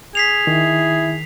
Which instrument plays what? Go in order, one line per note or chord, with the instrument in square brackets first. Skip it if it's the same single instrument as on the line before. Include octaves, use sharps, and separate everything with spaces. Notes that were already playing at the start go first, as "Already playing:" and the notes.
[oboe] G#4 [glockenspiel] B6 C7 F7
[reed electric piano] D#3 [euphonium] E4